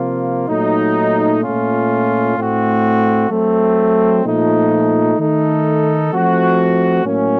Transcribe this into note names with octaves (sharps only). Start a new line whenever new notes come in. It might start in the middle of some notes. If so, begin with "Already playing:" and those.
Already playing: C3 F3 A#3 F4
A#2 F#3 A3 D#4
A#2 A3 C#4 F4
A2 A3 C4 F#4
F#3 A3 C4
A#2 F3 A3 D#4
D#3 A3 D#4 A4
F3 A3 C4 F#4
A2 F#3 A#3 C#4